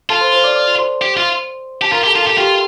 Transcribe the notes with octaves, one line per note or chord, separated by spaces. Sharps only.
F4 A4 A5
C5 C6
C5 C6
D5 D6
D5 D6
C5 C6
G4
F4
G4 A5
F4 A#4 A#5
G4
A4 A5
F4
A4 A5
G4
F4 G4 G5